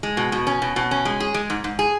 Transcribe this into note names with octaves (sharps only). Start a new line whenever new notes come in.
G#3
B2
B2
C#4
B2
B2
C#4
G#3
G#4
G#3
G#2
G#2
G#4